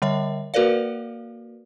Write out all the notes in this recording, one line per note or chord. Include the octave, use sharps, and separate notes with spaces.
D3 G3 C#5 E5
A#3 F#4 A#4 B4 D5 F5